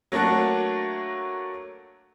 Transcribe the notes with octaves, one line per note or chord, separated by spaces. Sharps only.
F#3 A3 A#3 D4 F#4